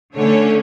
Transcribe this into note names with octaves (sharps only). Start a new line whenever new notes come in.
D3 A3 C#4 C#5